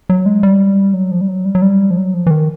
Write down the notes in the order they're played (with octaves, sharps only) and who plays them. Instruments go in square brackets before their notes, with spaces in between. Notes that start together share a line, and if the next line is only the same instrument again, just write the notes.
[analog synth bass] F#3
G#3
G3
F#3
F3
G3
F#3
G3
F#3
G3
F3
F#3
F3
E3
D#3